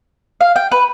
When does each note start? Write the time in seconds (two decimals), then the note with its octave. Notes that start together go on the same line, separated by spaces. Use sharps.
0.41 F5
0.56 G5
0.72 B4